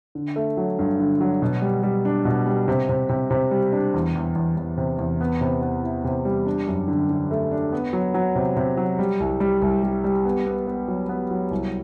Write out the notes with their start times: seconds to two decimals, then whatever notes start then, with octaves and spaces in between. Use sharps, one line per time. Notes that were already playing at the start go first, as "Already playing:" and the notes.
0.15 D3
0.36 A3
0.57 F#3
0.79 G2
1.00 D3
1.21 F#3
1.42 B2
1.62 G3
1.83 G3
2.05 D4
2.25 B2
2.47 G3
2.68 C3
2.89 C3
3.09 C3
3.31 C3
3.51 G3
3.72 D4
3.94 E2
4.15 E2
4.35 E2
4.57 E2
4.78 C3
4.98 E2
5.21 B3
5.41 C3
5.62 B3
5.83 E4
6.04 C3
6.25 G3
6.46 D4
6.68 F#2
6.88 D3
7.10 D3
7.31 A3
7.51 D4
7.73 B3
7.93 F#3
8.14 F#3
8.35 C3
8.56 C3
8.77 F#3
8.99 G3
9.20 C2
9.40 G3
9.62 C2
9.83 G3
10.04 G3
10.25 B3
10.46 B3
10.67 B3
10.88 F#3
11.09 B3
11.31 F#3
11.51 C2